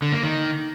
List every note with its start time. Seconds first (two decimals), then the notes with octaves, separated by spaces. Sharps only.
0.02 D3
0.12 A#3
0.23 D#3